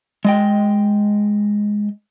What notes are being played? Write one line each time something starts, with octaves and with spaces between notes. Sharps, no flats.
G#3 D#5 G5